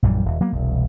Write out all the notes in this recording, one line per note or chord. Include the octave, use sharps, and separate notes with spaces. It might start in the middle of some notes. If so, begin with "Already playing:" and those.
A#1 F#2 E3 G3
D#1
F#3 A#3 B3
E1 C2